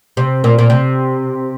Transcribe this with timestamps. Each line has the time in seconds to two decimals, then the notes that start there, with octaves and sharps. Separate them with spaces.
0.17 C3
0.44 A#2
0.58 A#2
0.70 C3